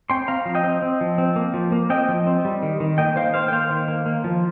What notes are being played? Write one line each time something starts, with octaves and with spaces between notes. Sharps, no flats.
C4 G5 C6
C4 F5 A#5
F3
D#5 G5
C4
C4
F3
C4
A#3
F3
A#3
C4 D#5 G5
F3
C4
G3
D#3
D#3
A#3 D#5 G5
D#3 C5 F5
A#3 C5 F5
G5
A#3 C5 F5
D#3
A#3
A#3
F3